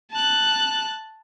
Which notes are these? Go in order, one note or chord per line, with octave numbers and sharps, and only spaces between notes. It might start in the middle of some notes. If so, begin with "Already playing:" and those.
A5 F#6